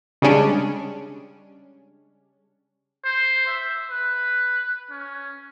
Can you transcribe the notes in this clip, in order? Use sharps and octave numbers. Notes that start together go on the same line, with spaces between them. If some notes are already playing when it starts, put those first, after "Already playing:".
C#3 G3 G#3 C#4 D4
C5
E5
B4
C#4